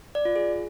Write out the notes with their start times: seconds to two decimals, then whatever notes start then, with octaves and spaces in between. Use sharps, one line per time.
0.15 D5
0.25 F4
0.36 G#4